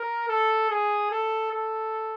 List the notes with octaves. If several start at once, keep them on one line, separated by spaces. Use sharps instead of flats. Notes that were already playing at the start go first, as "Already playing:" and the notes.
Already playing: A#4
A4
G#4
A4
A4